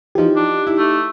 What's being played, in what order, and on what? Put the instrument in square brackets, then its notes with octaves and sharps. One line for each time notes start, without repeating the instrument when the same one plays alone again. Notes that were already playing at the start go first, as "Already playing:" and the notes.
[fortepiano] E3 F3 [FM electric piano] D#4 G4
[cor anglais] D4
[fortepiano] E4
[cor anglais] A3